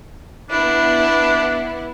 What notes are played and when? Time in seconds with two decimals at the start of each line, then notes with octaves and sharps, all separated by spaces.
0.51 B3 D4 E4